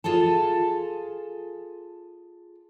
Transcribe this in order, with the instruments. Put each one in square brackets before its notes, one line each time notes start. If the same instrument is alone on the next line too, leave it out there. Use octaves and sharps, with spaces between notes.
[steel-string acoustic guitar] F4 G#4 A4 A5